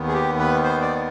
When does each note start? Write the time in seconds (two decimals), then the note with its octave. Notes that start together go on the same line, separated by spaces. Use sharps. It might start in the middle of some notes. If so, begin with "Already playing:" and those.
Already playing: D#2 D#3 B3
0.08 G#4
0.14 G4
0.39 B4
0.64 C5
0.82 D5